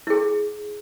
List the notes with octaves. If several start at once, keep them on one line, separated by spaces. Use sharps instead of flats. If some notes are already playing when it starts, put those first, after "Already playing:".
E4 G#4